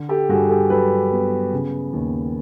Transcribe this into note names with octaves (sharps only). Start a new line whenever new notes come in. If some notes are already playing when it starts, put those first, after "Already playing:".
Already playing: D3
G4 A4
G2 F#4 G#4
G4 A4
F#3 A4 B4
B3
C#3
D#2